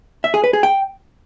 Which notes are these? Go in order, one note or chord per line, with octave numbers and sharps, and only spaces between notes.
E5
G#4
B4
G#4
G5